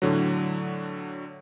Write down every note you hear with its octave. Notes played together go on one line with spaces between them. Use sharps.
A2 D3 F#3